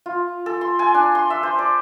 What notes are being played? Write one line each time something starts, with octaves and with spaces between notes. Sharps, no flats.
F4
A4
C6
G#5
D4
C6
E5
C5
D5